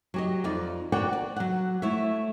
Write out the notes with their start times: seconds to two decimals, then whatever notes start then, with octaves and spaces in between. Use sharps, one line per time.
0.14 F#3 G4 D#5
0.44 F2 D#4 F4 D5
0.92 F#4 A#4 C#5 D5 F#5 G5
1.13 D5
1.36 F#3 F#5
1.82 A3 E4 C#5 E5